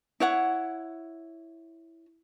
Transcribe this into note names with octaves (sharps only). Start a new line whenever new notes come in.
E4 C#5 F#5